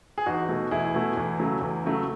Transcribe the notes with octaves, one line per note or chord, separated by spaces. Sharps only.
G#4
E2 D#4 F#4
B2 A3
E2 E4 G#4
B2 A3
E2
C#3 F#3 A3
E2
C#3 F#3 A3